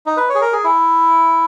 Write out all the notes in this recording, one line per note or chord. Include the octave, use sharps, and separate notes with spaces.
D#4
B4
C#5
G#4
A#4
G#4
E4